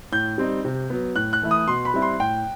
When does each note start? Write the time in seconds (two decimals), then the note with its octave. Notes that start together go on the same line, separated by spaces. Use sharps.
0.12 A2 G6
0.38 G3 C4 D#4
0.65 C3
0.90 F#3 B3
1.15 A2 F#6
1.33 F#6
1.42 E3 A3 E4
1.51 D#6
1.67 B2 C6
1.85 B5
1.94 G3 C4 E4
2.02 C6
2.20 A2 G5